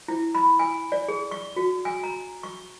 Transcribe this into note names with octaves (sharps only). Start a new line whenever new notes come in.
E4
B5
G#5
D5
G#4
C#6
F#4
G#5
A#5
C#6